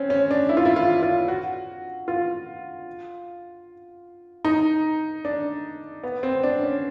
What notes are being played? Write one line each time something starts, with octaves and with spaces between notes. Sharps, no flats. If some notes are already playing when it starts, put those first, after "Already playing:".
Already playing: C4 C#4
C#4
D4
E4
F4
E4
F4
F4
F#4
F4
D#4
D4
B3
C4
D4
C#4